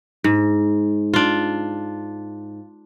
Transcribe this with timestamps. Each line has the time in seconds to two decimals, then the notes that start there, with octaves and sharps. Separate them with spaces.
0.24 G#2
1.14 D4 F4